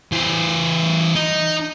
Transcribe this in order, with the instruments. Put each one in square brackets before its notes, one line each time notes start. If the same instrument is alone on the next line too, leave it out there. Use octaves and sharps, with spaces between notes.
[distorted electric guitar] E3 C5
D#4